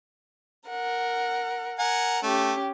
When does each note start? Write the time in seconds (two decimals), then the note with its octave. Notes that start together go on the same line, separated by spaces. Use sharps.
0.69 A#4 F#5
1.79 A#4 F#5 G#5
2.23 A3 C#4 G4